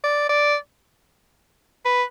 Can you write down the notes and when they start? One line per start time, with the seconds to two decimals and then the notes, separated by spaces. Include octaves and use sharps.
0.04 D5
0.29 D5
1.85 B4